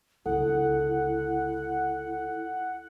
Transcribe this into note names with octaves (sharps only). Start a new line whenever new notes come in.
C#2 D3 E4 A4 F#5